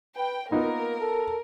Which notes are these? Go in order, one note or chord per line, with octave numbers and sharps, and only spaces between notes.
B4 G5
A#3 B3 D#4 F4 A#4
A4